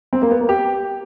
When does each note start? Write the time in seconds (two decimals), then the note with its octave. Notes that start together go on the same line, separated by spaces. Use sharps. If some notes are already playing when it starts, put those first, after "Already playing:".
0.13 C4
0.22 A#3
0.31 B3
0.40 A#3
0.49 G4